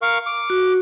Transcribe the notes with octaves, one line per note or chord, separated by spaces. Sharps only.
A#4 F5 C#6
D6
F#4